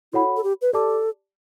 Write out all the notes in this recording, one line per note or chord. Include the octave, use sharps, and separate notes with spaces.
E4 F#4 A4 C#5 F#5 B5
A4
G4
B4
G4 A4 D5 A5 D6